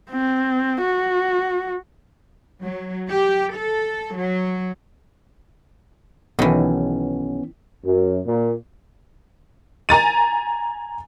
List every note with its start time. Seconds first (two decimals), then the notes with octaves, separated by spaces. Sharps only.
0.10 C4
0.81 F#4
2.62 F#3
3.09 G4
3.55 A4
4.15 F#3
6.39 B1 D#3 E3 B3 C#4
7.85 F#2
8.26 A#2
9.89 G#5 A#5 A6 D#7